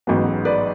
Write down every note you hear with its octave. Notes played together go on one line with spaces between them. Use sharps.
A1 G#2 F#3 B3
B4 D5